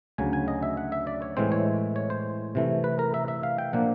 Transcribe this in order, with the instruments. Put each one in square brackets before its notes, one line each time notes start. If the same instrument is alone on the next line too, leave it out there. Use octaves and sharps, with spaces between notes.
[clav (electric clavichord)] D2 C#3 F#3 G#5
G#5
D#5
E5
F#5
E5
D5
C#5
A2 E3 G#3 C4 C5
C#5
C#5
C5
C3 E3 A3
B4
A#4
E5
E5
F5
G5
A#2 F3 A#3 D4 F#5